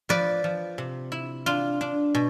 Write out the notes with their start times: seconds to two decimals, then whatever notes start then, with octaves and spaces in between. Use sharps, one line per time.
0.09 F3 B4 D5
0.44 F3
0.78 C3
1.12 E4
1.46 D4 F4
1.81 D4
2.15 B2